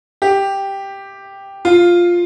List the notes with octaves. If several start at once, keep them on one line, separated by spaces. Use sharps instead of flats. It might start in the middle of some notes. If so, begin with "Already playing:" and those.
G4
F4